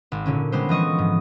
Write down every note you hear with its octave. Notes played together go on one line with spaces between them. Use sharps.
G#1
A#2 D3 C#4
D3 G3 G#3 B3 C5
E3 F3 D#5 C#6
G#2